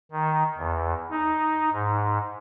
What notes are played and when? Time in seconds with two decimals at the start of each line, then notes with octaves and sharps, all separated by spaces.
0.12 D#3
0.58 E2
1.10 D#4
1.73 G#2